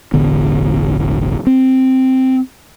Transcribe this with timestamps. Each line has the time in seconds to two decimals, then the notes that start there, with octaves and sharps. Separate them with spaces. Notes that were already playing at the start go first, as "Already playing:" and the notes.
0.13 E1 A1 D3 B3
1.47 C4